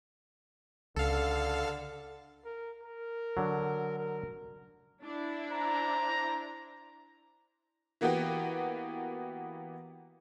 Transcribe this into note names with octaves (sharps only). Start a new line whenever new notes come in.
C#2 D3 A4 F5
A#4
A#4
D3 F#3
A#4
D4 E4
C5 D5 A#5
E3 A#3 B3 F#4 G4